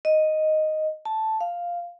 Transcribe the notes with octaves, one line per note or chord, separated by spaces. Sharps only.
D#5
A5
F5